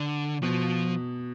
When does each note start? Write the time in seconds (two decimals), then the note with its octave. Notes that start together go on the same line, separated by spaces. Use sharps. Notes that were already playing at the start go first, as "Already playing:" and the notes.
Already playing: D3
0.43 B2 F3